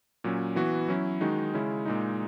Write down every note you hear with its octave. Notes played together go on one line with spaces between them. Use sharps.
A#2 F#3 C#4
E3 B3 F#4
F#3 C#4 E4
D#3 G#3 D#4 F#4
C#3 G#3 C#4 E4
A#2 G#3 D#4